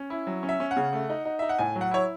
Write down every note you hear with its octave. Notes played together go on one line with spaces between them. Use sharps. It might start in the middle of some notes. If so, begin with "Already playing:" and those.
Already playing: C#4
E4
F#3
C#4
E5
C#4
F#5
C#3
A3
D#4
D#4
D#4 E5
F#5
A2 G#5
F#3
F#5
E4 C#5